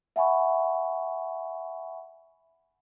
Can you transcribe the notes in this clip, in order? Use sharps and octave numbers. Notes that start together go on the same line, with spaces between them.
E5 F#5 G#5 B5 C#6